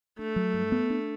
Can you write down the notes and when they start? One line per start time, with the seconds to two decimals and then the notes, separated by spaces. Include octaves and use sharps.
0.19 A3 D4
0.36 F#3
0.54 G2
0.72 B3
0.90 D4